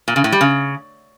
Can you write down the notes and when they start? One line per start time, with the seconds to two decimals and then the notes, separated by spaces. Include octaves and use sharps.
0.08 A#2
0.16 C#3
0.24 A2
0.32 G3
0.41 C#3